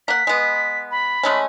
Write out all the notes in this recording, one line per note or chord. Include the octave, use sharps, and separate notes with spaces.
A#3 F#5 B6
G#3 B3
B5
G#3 A3 C#4